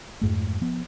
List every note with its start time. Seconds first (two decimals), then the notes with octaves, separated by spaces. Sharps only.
0.21 F2 G#2 A3
0.61 F3 B3